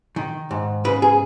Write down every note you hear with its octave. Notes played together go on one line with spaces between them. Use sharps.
D#3
G#2
C#3 B4
G#4